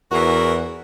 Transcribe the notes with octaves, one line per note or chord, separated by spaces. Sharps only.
E2 E3 F#4 A#4